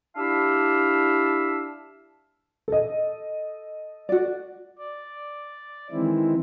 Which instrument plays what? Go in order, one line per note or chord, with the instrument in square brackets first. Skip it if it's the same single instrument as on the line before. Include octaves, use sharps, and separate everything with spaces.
[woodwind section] D4 E4 G4 E5 F5 A5
[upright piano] A4 D#5
[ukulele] F#4 D5
[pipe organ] D5
D#3 E3 G#3 C4 E4